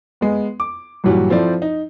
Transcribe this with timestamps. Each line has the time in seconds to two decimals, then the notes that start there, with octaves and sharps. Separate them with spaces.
0.21 G#3 B3
0.60 D6
1.04 G2 A#2 E3 F#3 G3
1.30 F3 C4 E4 A4 C5 D5
1.62 D#4